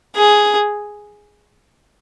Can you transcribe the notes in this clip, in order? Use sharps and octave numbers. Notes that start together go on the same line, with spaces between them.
G#4